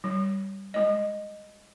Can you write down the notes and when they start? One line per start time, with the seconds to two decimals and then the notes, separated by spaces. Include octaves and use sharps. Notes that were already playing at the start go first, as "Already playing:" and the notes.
0.04 G3
0.74 G#3 D#5